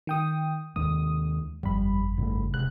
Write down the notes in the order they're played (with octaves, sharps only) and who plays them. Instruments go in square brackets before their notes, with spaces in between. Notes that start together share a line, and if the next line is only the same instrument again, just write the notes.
[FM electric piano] D#3 G5 D#6
[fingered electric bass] D#2 D#3 G#3 [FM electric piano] D#6
[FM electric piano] G1 F2 B5 [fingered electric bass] G3
[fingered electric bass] G2 C#3 A3
[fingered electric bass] F1 C3 G#3 [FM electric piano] F#6